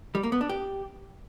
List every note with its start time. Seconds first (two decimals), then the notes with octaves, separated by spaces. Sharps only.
0.15 G3
0.23 A#3
0.32 B3
0.41 D4
0.49 G4